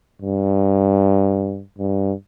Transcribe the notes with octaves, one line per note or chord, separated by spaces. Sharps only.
G2
G2